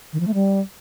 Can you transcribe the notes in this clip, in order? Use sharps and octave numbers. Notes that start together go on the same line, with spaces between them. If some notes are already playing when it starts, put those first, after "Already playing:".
D#3
F3
A3
G3